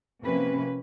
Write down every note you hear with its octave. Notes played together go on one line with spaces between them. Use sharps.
C3 F3 A#3 C#4 B4